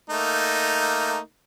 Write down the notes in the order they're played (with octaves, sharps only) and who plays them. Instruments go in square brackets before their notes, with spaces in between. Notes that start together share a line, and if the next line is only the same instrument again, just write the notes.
[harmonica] A3 A#3 D#4